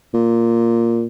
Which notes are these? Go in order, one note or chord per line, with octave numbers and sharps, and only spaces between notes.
A#2